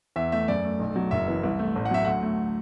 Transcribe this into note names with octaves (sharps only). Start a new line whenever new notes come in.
E2 E5
A3 E5
F#2 D5
A3
B1
F#3
F#1 E5
E3
C2
A3
A1
F#5
F#3 E5
D2 F#5
A3